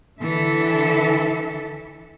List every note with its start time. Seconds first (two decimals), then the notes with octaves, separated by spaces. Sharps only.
0.21 D3 E3 A4 E5